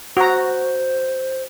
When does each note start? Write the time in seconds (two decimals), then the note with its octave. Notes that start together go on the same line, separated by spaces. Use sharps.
0.17 F#4 C5 A#5